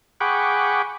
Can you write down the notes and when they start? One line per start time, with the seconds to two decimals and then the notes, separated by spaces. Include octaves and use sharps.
0.20 G#4 F#5 G5 B5 C#6 D6